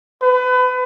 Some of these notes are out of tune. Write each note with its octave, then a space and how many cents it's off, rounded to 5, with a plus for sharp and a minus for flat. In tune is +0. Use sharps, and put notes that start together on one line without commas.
B4 +30